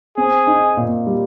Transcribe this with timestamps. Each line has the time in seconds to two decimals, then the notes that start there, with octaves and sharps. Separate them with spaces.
0.17 C4 G#4
0.47 D#4
0.77 A#2
1.07 G3